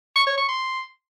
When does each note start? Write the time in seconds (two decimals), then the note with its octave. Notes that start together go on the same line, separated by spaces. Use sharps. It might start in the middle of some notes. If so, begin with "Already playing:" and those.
0.16 C#6
0.26 C#5
0.37 C#6
0.48 C6